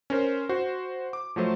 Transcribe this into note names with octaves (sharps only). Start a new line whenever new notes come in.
C#4 A#4 C5
F#4 C5
D6
F3 F#3 A3 C5